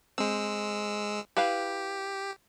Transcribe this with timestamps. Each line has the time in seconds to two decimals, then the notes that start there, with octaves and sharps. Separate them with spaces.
0.18 G#3 C4 E6
1.37 E4 G4 B4 F5